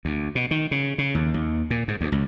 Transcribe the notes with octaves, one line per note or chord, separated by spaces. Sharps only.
D2
B2
D#3
C#3
C#3
D#2
D#2
A#2
G#2
D2
C#2